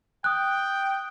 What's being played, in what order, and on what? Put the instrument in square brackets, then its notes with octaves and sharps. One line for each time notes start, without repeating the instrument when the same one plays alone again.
[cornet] G5 [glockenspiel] D#6 F#6